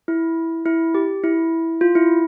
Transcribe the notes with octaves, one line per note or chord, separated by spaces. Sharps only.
E4
E4
G4
E4
F4
E4